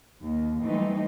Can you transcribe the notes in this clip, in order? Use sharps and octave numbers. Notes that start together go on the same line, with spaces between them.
D#2
E3 F#3 G3 A3 C4 D#4